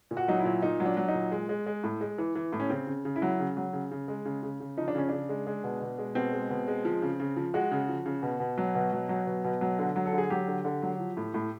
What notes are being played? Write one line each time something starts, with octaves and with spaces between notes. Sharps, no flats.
A#2
F#4
F#3 D#4
E4
A#2
A#2 D#4
F#3
D4
F#3
D#4
A#2
G#3
G#3
G#3
A2
G#3
E3
E3
A2
C#4
C#3 C4
C#3
C#3
E4
F#3
C#3
F#3
C#3
C#3
G#3
C#3
C#3
C#3
F3 D#4
D4
C#3 C#4
C#3 D4
G#3
G#3
B2
B2
G#3
B2 C4
G#3
B2
G#3
F3
C#3
C#3
F3
G#3 F#4
C#3
F3
C#3
B2
B2
F#3
B2
F#3
F#3
B2
B2
F#3
D3
F#3
A4
D3
G#4
F#3 G4
D3
D3
F#3
F3
A2
A2